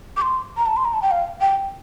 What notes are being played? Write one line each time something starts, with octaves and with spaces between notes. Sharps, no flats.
D6
C6
A#5
A5
C6
A#5
A5
G5
F5
G5